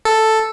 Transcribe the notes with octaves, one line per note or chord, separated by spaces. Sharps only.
A4